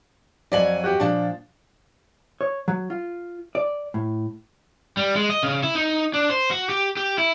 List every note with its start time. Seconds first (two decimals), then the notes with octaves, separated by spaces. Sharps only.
0.52 F2 F#3 D5 G#5 F#7
0.84 F#4 G4
1.00 A#2 F3 D4
2.41 C#5
2.68 F#3
2.90 F4
3.55 D5
3.94 A2
4.97 G3
5.16 G#3
5.30 D#5
5.43 C#3
5.63 E4
5.75 D#4
6.14 D4
6.30 C5
6.51 F#4
6.69 G4
6.97 G4
7.18 E4